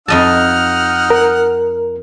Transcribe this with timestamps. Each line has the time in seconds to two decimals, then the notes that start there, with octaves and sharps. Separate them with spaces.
0.08 F2 D#4 D#5 F#5 A5 F6
1.10 A#4